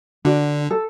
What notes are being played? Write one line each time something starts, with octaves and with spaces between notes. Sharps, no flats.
D3 D4 F#4
A4